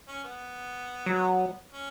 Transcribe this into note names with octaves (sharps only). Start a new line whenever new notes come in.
C#4
B3
F#3
C#4